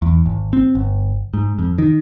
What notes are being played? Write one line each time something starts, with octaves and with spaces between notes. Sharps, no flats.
E2
G#1
C4
G1
G#2
F2
D#3